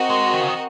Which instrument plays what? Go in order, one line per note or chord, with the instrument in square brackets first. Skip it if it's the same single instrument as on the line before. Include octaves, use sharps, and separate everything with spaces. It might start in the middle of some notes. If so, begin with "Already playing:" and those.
Already playing: [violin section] C4 F#4 A#4 D#5
[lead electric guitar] G#3
D#3
C#3
D#3